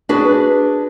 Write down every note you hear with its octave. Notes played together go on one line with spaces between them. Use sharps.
D4 F#4 G#4 B4